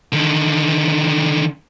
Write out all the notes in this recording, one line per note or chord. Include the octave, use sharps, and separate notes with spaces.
D3 D#3